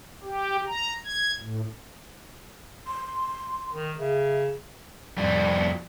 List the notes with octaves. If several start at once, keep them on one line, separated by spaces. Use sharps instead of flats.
G4
A#5
G#6
A2
C6
D#3
C#3 E5
F2 G3